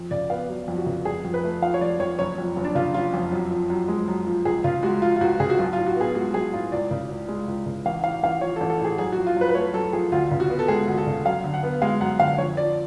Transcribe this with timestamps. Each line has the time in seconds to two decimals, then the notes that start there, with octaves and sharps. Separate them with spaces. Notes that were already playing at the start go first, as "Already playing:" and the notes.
Already playing: F2
0.11 C#3 D5
0.30 B3 F5
0.49 F#3
0.68 F2
0.77 F#4
0.86 C#3
1.05 F1 G#4
1.25 F2
1.34 B4
1.44 A3
1.62 F3 F5
1.74 C#5
1.81 F1 D5
2.00 F2 C#5
2.19 F#1 C#5
2.38 F2
2.56 F#1
2.64 D4
2.75 C#3 F4
2.94 F#1 F4
3.14 F2
3.32 F#2
3.51 F3
3.70 F#2
3.88 G#3
4.08 F#2
4.27 F3
4.45 C#2 G#4
4.64 C#3 F4
4.83 G#3 F#4
5.02 F3 F4
5.16 F4
5.21 C#2 F#4
5.40 C#3 G#4
5.50 F#4
5.59 B1 F4
5.73 F4
5.78 A2
5.87 F#4
5.96 B3 G#4
6.15 G#3 F#4
6.34 B1 G#4
6.53 A2 F4
6.72 C#2 D5
6.91 C#3
7.10 C#2
7.28 G#3
7.48 C#2
7.66 C#3
7.86 A1 F5
8.04 A2 F5
8.23 A1 F5
8.41 F3 C#5
8.56 A4
8.61 A1
8.70 A4
8.80 A2 G#4
8.98 F#2 G#4
9.12 F#4
9.18 F3
9.27 F4
9.36 F#2 B4
9.49 B4
9.55 A3 C#5
9.74 F#2 A4
9.93 F3 G#4
10.12 D2 F4
10.31 C#3
10.40 F#4
10.50 B3
10.59 A4
10.68 G#3 G#4
10.88 D2
10.98 A4
11.07 C#3
11.25 F#2 F5
11.44 D3
11.54 F#5
11.63 B3
11.82 G#3 F5
12.01 F#2 F#5
12.20 D3 F5
12.38 F2 C#5
12.57 F3 D5